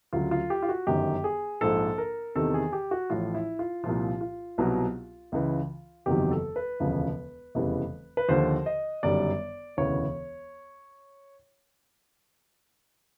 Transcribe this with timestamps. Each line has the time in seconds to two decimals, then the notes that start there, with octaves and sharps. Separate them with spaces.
0.13 D2 C#3 F#3 F4
0.31 F4
0.50 G4
0.62 F4
0.69 F#4
0.87 G1 F#2 D#3 G4
1.24 G#4
1.61 A#1 G#2 F3 A4
1.98 A#4
2.35 E2 C3 D#3 A4
2.54 G#4
2.73 G4
2.91 F#4
3.10 A1 A2 F3 F4
3.34 E4
3.59 F4
3.84 C2 A#2 F3 F4
4.21 F4
4.58 C2 B2 F#3
5.32 C#2 C#3 E3
6.06 F#1 E2 C3 D#3 F#3 G4
6.31 A4
6.56 B4
6.80 E1 D2 C#3 F3
7.55 F1 E2 C#3 E3 G3
8.17 B4
8.29 D#2 D3 F3 C5
8.66 D#5
9.03 G1 F#2 D#3 G3 D5
9.77 E1 D2 C#3 E3 C#5